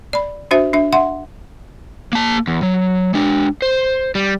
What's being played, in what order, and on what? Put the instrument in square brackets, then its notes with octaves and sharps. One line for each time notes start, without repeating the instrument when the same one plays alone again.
[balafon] D5 B5
D4 F#4 C5 E5
D4 E5
E5 F#5 C6
[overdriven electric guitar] A#3 A5
E2
F#3
G#3 D4
C5
G3